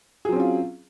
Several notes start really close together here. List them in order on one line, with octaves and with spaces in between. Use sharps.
G#4 F#3 C4 C#4 F4